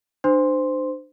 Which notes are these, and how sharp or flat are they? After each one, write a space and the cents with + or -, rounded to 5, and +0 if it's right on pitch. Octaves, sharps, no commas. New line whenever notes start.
D4 +35 C5 -20 C6 +0